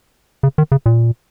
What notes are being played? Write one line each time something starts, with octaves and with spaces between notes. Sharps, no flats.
C#3
D#3
C#3
A#2